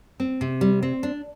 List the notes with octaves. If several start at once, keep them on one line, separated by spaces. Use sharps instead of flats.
C4
C3
G3
C4
D4